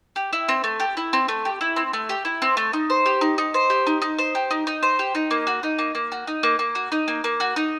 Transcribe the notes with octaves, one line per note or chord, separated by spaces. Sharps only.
G4
E4
C4
A3
G4
E4
C4
A3
G4
E4
C4
A3
G4
E4
C4
A3
D#4
C5
G4
D#4
D#4
C5
G4
D#4
D#4
C5
G4
D#4
D#4
C5
G4
D#4
A#3
F#4
D#4
A#3
A#3
F#4
D#4
A#3
A#3
F#4
D#4
A#3
A#3
F#4
D#4